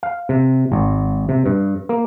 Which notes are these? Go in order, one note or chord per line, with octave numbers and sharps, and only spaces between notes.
F5
C3
G#1
C3
G2
A#3